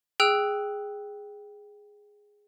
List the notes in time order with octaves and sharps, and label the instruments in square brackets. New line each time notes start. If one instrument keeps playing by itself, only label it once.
[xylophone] G#4 G5 E6 F#6 F7